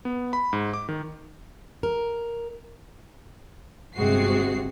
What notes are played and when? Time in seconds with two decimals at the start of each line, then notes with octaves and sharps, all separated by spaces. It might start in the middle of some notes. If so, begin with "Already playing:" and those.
0.05 B3
0.33 B5
0.53 G#2
0.73 D6
0.89 D#3
1.83 A#4
3.95 G1 C3 G#3 F#4 C7